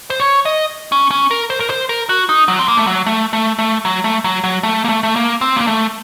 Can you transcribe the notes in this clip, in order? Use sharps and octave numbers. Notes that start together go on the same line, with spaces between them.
C5
C#5
D#5
C#4
C#4
A#4
C5
A#4
C5
A#4
F#4
D#4
F#3
C4
A#3
A3
F#3
A3
A3
A3
F#3
A3
F#3
F#3
A3
A#3
A3
A3
A#3
C4
A#3
A3